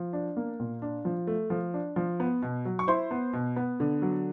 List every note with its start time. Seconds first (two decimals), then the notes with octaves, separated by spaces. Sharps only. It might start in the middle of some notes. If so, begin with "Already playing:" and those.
Already playing: F3
0.13 D4
0.37 A#3
0.60 A#2
0.82 D4
1.05 F3
1.27 A3
1.50 F3
1.74 D4
1.96 F3
2.20 B3
2.42 B2
2.65 F#3
2.79 C#6
2.88 E4 C5 C6
3.11 B3
3.33 B2
3.56 B3
3.80 D3
4.02 F#3